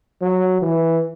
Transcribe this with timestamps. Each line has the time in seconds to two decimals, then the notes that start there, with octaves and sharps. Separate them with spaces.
0.22 F#3
0.62 E3